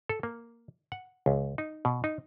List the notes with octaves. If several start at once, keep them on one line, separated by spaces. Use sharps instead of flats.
A4
A#3
F#5
C#2
D#4
B2
D#4